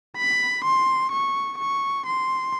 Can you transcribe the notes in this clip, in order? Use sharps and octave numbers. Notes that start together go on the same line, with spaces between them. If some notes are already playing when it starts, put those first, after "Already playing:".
B5
C6
C#6
C#6
C6